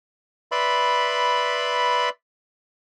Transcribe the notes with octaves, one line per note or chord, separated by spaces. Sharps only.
B4 D5 E5 B5 C6